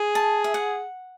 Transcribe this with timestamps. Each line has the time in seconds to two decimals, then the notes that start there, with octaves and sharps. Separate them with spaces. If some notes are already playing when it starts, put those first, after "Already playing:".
Already playing: G#4
0.15 A5
0.44 E5
0.54 F#5